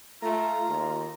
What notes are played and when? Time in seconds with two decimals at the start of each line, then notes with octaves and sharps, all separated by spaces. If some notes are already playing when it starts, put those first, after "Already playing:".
0.22 A3 F4 A#5
0.69 D#2